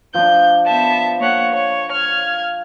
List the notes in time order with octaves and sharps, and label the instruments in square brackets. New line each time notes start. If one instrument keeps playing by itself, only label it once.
[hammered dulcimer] F3 D4 [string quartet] G6
[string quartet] B3 E5 A5
A#3 C#5 F#5
C#5
F6 G#6